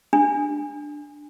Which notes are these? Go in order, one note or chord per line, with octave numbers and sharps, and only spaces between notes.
D4